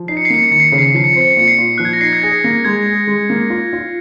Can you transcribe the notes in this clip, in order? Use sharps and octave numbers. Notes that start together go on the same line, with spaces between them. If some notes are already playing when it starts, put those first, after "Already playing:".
Already playing: F3
D#4 C7
C#7
C7
A#3 C#7
C7
D#3 C#7
C7
C#3 C#7
C7
C#7
F3 C7
C#7
C4 C7
C#7
C7
A#2 C#7
C7
A#2
F3 F#6
G#6
A#6
D#4 C7
G#6
G#4 A#6
A#3 A#6
G#3 G#6
G#4
G#3
A#3
F4
F4